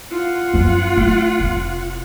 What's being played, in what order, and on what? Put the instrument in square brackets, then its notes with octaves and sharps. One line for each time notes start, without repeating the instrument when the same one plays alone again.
[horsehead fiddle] F4 F#5
[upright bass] F#2 F3
A3 D#4
F1